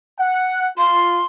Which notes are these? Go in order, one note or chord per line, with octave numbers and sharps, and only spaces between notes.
F#5
F4 C6